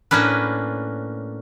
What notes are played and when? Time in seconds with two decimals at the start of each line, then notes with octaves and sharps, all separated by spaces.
0.11 A2 A#3 C#4 D4 B4